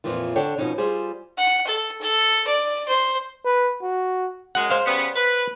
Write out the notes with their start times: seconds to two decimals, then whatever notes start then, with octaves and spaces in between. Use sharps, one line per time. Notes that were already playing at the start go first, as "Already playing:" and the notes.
0.04 F2 A#2 E3 F3 F4
0.36 D3 D4 A4 C#5 G5
0.58 B2 E3 F3 C#4 D#4 C#5
0.78 G3 F4 G#4 C5
1.37 F#5
1.67 A4
2.01 A4
2.47 D5
2.88 C5
3.45 B4
3.82 F#4
4.55 F#2 G#3 F#5
4.70 C5 F5
4.86 C#3 G3 B3
5.16 B4